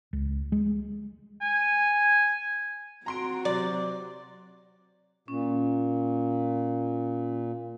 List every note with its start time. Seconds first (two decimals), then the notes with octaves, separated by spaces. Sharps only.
0.13 C#2
0.52 G#3
1.42 G#5
3.06 C4 F#4 A#5 C6 D7
3.45 C3 F#3 D5
5.28 A#2 C#4